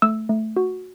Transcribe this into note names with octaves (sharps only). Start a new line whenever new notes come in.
A3 E6
A3
F#4